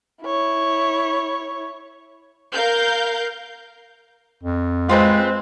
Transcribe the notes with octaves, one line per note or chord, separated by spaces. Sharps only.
E4 C#5
A#4 F5 G6
F2
G#3 C4 F4 G#4 B4